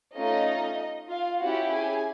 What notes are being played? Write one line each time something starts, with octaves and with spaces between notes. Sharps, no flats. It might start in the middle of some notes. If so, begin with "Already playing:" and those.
A3 C#4 D#4 F4 D#5
F4 F5
C#4 E4 F#4 G4 F#5
G#4 G#5